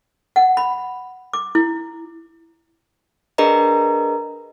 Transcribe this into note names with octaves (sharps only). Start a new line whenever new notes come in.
F#5
B5
D6
E4
D4 G#4 A#4 B4 D#5 A#5